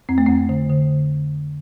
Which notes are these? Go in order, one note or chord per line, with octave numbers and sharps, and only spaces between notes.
F2 C4
A3
F2 C4
D3
D3